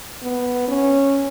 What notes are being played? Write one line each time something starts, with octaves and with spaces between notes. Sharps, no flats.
B3
C#4